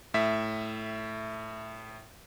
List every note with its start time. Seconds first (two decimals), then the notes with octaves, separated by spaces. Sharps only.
0.14 A2 E5 B6